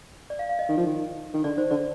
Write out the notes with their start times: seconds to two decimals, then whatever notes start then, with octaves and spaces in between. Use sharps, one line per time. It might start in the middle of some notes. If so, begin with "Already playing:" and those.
0.30 D5
0.39 F5
0.49 F5
0.59 D#5
0.69 D#3
0.77 F3
0.86 D#3
1.34 D#3
1.44 D3 D5
1.57 D#3 C5
1.71 D3 D5